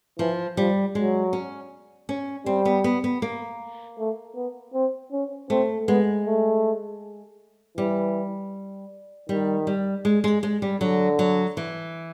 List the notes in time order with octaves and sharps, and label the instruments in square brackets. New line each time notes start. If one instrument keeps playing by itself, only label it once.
[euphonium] E3 [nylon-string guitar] F3
[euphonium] F3 [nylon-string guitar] G3
[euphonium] F#3 [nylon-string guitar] G#3
[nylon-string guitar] C#4
C#4
[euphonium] G3 [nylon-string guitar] C4
[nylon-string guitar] B3
B3
B3
A#3
[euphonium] A3
B3
C4
C#4
[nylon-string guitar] A3 [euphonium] C4
[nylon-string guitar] G#3 [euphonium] B3
[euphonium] A3
[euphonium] E3 [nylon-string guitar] G3
[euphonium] D#3 [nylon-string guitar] G3
[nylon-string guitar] G3
G#3
G#3
G#3
G3
[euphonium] D3 [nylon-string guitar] F#3
[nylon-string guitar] F#3
E3